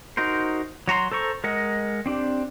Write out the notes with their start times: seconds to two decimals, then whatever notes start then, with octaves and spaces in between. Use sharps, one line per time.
0.17 D#4 F#4 A#4 C5
0.88 F#3 F#4 A#5 C6
1.12 A4 C5 A#5 C#6
1.44 G#3 A#4 D#5 F#5
2.06 C4 D4 G4